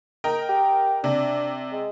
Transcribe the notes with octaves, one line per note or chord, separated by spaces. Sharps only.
A#4 D#5 G5
G4
C3 D4
G#3